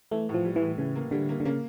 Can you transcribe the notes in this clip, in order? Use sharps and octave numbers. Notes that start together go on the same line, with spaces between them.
E3 A3
A2
F3
G3
E3
A2
C#3 E3
A#3
D3 G3
A#3
D3
C#3 A#3